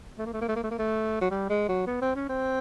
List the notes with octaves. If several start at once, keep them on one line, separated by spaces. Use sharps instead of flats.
A3
A#3
A3
A#3
A3
A#3
A3
A#3
A3
F#3
G3
G#3
F#3
B3
C4
C#4
C4